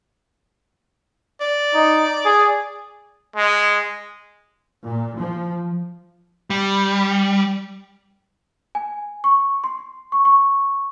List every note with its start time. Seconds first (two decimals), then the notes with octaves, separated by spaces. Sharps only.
1.41 D5
1.74 D#4
2.25 G#4
3.36 G#3
4.86 A#2
5.17 F3
6.50 G3
8.75 G#5
9.24 C#6
9.64 C6
10.12 C#6
10.25 C#6